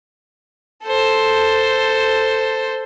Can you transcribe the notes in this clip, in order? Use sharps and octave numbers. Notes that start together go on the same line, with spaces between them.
A4 C5